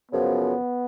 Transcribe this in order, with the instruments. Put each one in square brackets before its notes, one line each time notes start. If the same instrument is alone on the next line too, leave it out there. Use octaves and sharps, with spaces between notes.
[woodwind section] F#2 C#3 F3 [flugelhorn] B3